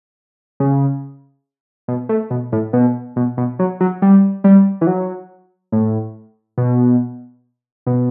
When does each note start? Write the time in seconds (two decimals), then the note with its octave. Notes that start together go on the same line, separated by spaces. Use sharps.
0.60 C#3
1.88 B2
2.09 A3
2.31 B2
2.52 A2
2.73 B2
3.16 B2
3.37 B2
3.59 F#3
3.80 F#3
4.02 G3
4.44 G3
4.81 E3
4.87 F#3
5.72 A2
6.58 B2
7.86 B2